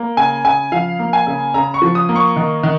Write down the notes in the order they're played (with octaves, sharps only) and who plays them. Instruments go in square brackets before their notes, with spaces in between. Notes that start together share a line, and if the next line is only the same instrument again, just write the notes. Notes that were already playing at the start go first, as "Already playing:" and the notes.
Already playing: [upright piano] A#3
C#3 G#5
C#3 G#5
F3 F5
A#3
G#5
C#3
C#3 A#5
C#6
F3
D#6
A#3
C#6
D#3
D#3